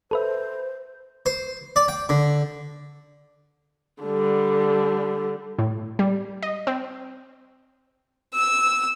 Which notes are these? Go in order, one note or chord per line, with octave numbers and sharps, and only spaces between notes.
A4 B4 C5 E5
C5
D5
G5
D3
D3 G3
A2
G3
D#5
C4
E6